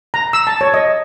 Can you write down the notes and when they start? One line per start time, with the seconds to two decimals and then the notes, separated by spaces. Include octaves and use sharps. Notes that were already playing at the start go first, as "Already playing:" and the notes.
0.14 A#5
0.33 E6
0.47 A5
0.61 C#5
0.74 D#5